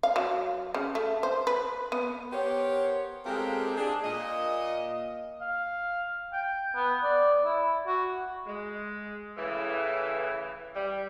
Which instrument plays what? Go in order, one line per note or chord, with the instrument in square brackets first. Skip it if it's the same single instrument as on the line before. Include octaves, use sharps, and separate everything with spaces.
[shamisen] F5
F#3
C#3
A3
C5
B4
B3
[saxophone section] B3 G4 A#4 C5 C#5
G#3 C4 F4 G4 A4 A#4
D4 G#4
A#2 D#5
[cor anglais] F5
G5
B3
D5
E4
F#4
[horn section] G#3
A2 C#3 E3
G3